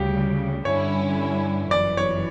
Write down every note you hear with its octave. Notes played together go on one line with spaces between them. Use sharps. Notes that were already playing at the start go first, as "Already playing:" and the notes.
Already playing: D2 C#3 G3 G4
G2 D3 G3 C#4 E4 C#5
G1 F#2 E3 D5
C#5